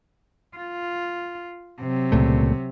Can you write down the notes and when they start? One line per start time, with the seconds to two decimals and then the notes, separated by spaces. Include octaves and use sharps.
0.57 F4
1.81 C3 F#3
2.12 C#2 A#2 A3